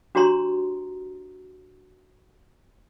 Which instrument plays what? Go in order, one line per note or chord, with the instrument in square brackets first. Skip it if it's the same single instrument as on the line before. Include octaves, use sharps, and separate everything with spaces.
[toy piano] D4 F#4 G4 C#5 A#5 C6